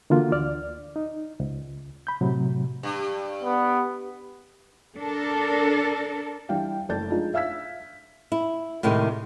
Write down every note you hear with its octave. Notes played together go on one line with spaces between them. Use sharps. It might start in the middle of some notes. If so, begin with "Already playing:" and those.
D3 E3 A#3 D4 F4 F#4
D2 D5 F6
D#4
C#2
B5 G6
A2 C3 F#3
G2
B3
D4 A4 A#4
E3 G3 D4 F5 G5
F#1 A3 D5 A5 G6 A6
F3 G#3 D4 D#4 F4
E5 F5 E6 G#6 B6
E4
A2 C3 D#3 G#3 E4